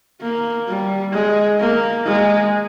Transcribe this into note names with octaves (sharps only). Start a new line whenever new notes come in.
A#3
G3
G#3
A#3
G#3